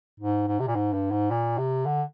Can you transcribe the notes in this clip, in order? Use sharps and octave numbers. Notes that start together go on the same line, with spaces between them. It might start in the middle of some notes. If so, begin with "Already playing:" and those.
G#2
G#2
C3
A#2
G#2
G2
G#2
A#2
C3
D3